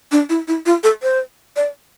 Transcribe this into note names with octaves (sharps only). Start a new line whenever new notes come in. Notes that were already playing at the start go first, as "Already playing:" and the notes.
D4
E4
E4
F4
A4
C5
D5